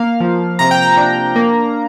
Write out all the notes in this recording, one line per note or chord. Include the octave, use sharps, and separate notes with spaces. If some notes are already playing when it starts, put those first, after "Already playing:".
Already playing: A#3 F5
F3
C3 A#5
G5
A#5
D4
A#3